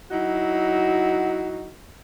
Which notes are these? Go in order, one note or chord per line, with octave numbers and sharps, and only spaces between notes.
F#3 D#4 E4 F#4